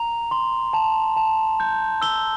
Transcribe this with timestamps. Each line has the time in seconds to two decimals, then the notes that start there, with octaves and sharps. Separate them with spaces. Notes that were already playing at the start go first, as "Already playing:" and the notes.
Already playing: A#5 F7
0.31 C6
0.73 A5
1.17 A5
1.60 G6
2.02 E6 G7